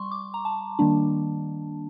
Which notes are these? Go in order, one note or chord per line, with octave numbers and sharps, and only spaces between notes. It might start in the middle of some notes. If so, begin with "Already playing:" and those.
Already playing: G3 C6 C#6
D6
A#5
A5
D#3 G3 A#3 D4